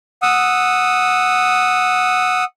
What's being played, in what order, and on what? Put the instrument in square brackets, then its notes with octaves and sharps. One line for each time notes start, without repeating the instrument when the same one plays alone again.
[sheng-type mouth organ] F#5 D#6 E6